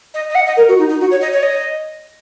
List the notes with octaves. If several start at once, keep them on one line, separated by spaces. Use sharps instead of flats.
D#5
D#5
F#5
D#5
A#4
F#4
D#4
D#4
F#4
C#5
D#5
C#5
D#5